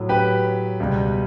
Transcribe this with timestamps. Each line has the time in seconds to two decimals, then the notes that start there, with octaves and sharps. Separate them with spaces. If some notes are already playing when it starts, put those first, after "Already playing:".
Already playing: A2 F#3
0.09 G4 B4
0.80 C#2 B2 G3